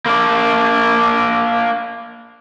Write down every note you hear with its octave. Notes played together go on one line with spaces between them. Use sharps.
A#3 D4